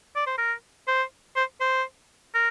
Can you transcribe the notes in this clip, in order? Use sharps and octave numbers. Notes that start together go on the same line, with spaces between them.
D5
C5
A#4
C5
C5
C5
A#4